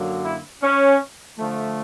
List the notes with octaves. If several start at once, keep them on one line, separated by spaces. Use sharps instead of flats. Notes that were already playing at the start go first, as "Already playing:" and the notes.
Already playing: F#2 D3 F#3 A#3
E4
C#4
D3 F3 A3